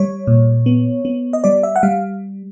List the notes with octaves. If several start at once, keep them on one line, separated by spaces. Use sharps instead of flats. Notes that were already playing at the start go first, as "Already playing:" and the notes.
Already playing: G3 C#5
A#2
B3
B3
D#5
G3 D5
E5
F#5
G3 F5